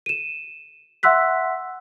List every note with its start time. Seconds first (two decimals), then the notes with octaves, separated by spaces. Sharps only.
0.06 D#7 E7
1.03 E5 F#5 C6 E6 F#6 B6